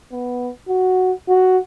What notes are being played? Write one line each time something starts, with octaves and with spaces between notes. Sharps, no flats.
B3
F#4
F#4